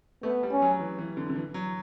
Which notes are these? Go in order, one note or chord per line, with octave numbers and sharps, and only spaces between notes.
A3 B3
G3
C#4
F#3
E3
E3
D3
D3
E3
F#3